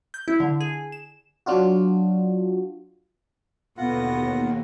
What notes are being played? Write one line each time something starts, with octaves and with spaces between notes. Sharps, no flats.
G6
E4
D3
G#4
E7
F#3 D4 F4 F#4
D#2 B2 D3 B3 F4 F#5 A#6